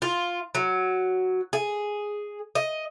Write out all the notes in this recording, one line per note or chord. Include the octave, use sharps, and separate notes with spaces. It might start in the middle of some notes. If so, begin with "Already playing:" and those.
F4
F#3
G#4
D#5